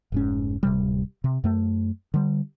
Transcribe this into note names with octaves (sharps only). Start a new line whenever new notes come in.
F1 G#2 C#4
D1 C3 G3
C3
F#2 A3
D3 G3